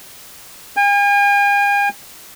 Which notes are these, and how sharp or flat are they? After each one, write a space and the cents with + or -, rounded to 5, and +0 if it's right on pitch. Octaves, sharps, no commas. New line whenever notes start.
G#5 -45